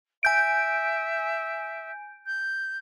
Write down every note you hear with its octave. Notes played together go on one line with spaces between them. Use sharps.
E5 G#5 G6 D7
G6